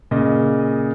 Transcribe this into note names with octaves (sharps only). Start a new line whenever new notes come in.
A#2 C#3 D#5